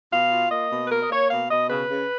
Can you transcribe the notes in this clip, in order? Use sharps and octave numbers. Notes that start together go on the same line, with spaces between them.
B2 F5
F4
A#3 D#5
B2
B4
A#3 A#4
D#5
A#3 C#5
B2 F5
B2 D#5
C#3 B4
C#3